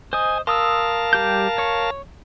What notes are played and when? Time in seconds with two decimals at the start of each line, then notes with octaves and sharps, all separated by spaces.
0.13 C5 D#5 G#5
0.47 A#4 F5 A5 C6 D#6 E6
1.13 G3 G4 G6
1.58 C#5 C#6